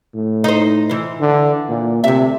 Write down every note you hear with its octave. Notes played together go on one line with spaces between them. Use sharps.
A2
D#4 C5
E3 C5
D3
A#2
D2 C3 E5